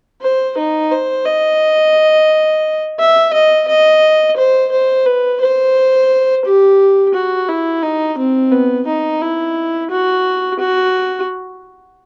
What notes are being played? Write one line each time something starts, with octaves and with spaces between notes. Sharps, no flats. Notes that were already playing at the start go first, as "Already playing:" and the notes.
C5
D#4
C5
D#5
E5
D#5
D#5
C5
C5
B4
C5
G4
F#4
E4
D#4
C4
B3
D#4
E4
F#4
F#4